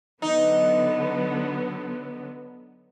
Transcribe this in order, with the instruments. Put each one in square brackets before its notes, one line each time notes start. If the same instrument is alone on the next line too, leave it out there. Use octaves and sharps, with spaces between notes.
[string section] D3 F#3 B3 [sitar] D#4